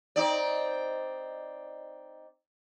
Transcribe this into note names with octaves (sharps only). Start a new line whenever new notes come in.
C4 D#4 D5